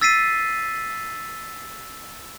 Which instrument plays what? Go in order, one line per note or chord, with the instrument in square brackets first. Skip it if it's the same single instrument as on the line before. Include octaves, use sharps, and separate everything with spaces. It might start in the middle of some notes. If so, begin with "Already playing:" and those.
[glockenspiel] E6 A6 B6 C7 D#7